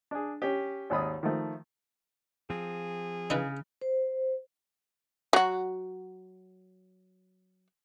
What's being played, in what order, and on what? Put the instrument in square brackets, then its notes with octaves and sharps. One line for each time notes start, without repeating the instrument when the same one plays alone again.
[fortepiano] D4 G#4
C#4 G4
G#1 D#2 B5 D#6
D#3 F3 A3
[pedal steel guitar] F3 C4 [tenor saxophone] G#4
[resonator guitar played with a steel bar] C#3 [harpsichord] D#4 E4 B4
[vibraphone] C5
[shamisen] F#3 F#4